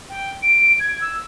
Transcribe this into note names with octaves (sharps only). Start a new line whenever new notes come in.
G5
D7
G#6
E6